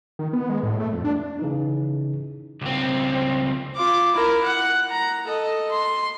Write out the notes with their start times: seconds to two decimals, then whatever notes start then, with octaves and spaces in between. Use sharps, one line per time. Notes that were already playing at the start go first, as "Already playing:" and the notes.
0.19 D#3
0.33 B3
0.49 G#3
0.63 A2
0.80 A3
0.93 F2
1.05 D4
1.39 C#3 E3 D#4
2.62 C#2 C4
3.75 F4 D6
4.13 E4 A#4
4.44 F#5
4.90 A#5
5.25 A4 D#5
5.70 C6